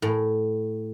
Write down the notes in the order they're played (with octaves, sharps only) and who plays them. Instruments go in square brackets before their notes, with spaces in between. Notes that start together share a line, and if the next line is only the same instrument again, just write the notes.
[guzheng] A2